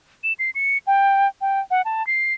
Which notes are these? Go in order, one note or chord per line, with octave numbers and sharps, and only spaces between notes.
E7
C7
C#7
G5
G5
F#5
A5
C7